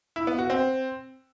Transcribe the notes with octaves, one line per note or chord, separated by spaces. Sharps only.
E4
B3
F#4
C4